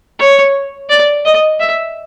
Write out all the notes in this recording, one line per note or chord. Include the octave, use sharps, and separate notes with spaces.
C#5
D5
D#5
E5